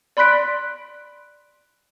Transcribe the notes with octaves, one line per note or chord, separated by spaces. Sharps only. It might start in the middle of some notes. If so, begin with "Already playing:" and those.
D5 B5 C6 F#6 B6 D7